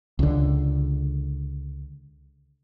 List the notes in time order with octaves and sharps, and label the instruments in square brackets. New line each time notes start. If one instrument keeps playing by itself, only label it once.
[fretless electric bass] C#2 D3